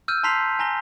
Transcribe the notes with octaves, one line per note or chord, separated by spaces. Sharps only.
E6 F6 G6 D#7
A5 A#5 C6 B6 C7 F7
G#5 A#5 A#6 G7